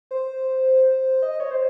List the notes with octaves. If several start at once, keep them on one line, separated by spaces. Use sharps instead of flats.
C5
D#5
C#5
C5